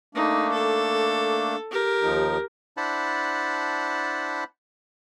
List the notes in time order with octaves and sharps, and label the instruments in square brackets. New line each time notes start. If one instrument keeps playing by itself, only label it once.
[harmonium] A3 A#3 D4 [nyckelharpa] D#4
[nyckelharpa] A4
G4 A#4
[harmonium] D#2 F3 D#4
[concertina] D4 E4 C5 F#5 A5 B5